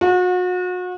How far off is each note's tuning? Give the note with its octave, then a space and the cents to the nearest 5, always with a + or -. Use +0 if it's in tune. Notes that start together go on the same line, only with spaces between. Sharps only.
F#4 -35 F#5 -25